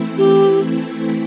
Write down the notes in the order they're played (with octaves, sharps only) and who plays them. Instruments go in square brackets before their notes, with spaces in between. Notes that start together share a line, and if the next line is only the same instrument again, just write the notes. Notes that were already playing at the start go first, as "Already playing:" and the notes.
Already playing: [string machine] E3 A3 C4 E4
[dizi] G4